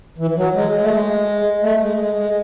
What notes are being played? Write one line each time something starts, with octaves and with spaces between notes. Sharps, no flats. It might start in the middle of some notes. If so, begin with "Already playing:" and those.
E3
E3
F#3
G#3
G#3
A3
G#3
A3
G#3
G#3
G#3